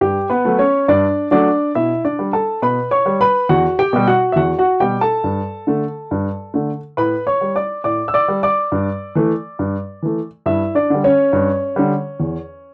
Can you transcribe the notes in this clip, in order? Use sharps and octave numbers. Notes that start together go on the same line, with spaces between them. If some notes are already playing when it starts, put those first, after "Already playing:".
G2 G4
B3 B4
F#3 A3
C#4 C#5
G2 D4 D5
F#3 A3 D4 D5
B2 E4 E5
D4 D5
G3
A4 A5
B2 B4 B5
C#5 C#6
G3
B4 B5
E2 F#4 F#5
G4 G5
B2 G3
F#4 F#5
E5
E2 F#4 F#5
F#4 F#5
B2 G3 G4 G5
A4 A5
G2
D3 A3
G2
D3 A3
A2 B4 B5
C#5 C#6
G3
D5 D6
A2 D5 D6
E6
D5 D6
G3
D5 D6
G2
E3 A3
G2
E3 A3
G2 E4 E5
D4 D5
D3 G3
C#4 C#5
G2
D3 G3
E2